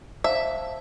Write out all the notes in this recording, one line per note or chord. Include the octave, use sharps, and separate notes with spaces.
C5 E5 F5 A5